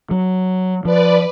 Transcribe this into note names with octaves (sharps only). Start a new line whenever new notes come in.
F#3
F3 B4 D5